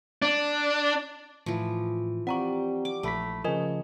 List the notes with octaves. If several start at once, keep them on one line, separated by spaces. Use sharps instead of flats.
D4
A2 E3 F3
G3 A#3 C4 G4 F#5 A#5 C#6
D6
A#1 A3 B5 B6
C#3 F3 D#4 A#4 D#5 G#5